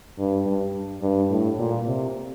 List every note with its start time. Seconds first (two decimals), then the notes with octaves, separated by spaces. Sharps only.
0.18 G2
0.46 G2
1.02 G2
1.30 A2
1.59 A#2
1.86 C3